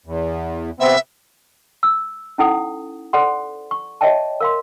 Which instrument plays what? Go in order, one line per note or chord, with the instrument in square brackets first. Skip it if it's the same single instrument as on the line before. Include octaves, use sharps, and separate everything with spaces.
[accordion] E2
[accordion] C3 B3 C4 [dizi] E5
[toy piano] E6
C#4 D#4 E4 A4 F#5 D#6
A4 C5 D5 F#5 C6
C#6
C#5 D#5 E5 G5 A5
A#4 F5 C6